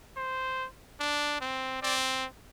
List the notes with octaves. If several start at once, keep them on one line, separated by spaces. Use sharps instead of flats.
C5
D4
C4
C4 D5